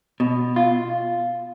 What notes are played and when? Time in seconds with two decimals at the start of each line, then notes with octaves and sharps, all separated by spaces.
0.20 B2
0.56 F4